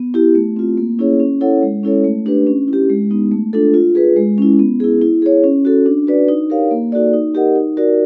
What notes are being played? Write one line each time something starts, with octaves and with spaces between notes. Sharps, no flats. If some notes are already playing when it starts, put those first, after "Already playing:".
Already playing: B3
E4 G4
A3
C4 F4
A#3
C#4 E4 G#4 C#5
C#4
E4 A4 C#5 F#5
G#3
C#4 E4 A4 C#5
A3
D4 G4 B4
C#4
E4 G4
G#3
B3 D#4
A3
D4 F4 A4
F4
G#4 B4
G#3
C#4 E4
B3
E4 G#4
E4
G#4 C#5
C#4
F#4 A4
D4
F#4 B4 D5
D#4
G4 A#4 C#5 F5
A#3
D#4 F#4 A4 D5
D#4
G4 A#4 D#5 F#5
D#4
F#4 A#4 D5